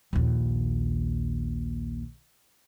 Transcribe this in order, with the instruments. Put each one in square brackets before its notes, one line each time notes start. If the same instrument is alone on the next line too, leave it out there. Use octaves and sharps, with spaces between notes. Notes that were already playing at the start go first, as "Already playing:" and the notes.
[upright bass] A#1 D#2